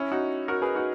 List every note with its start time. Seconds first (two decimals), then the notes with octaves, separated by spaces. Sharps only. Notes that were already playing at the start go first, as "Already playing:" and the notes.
Already playing: C#4 E4
0.12 D#4 F#4
0.48 F#4 A#4
0.62 G#4 B4
0.75 D#4 F#4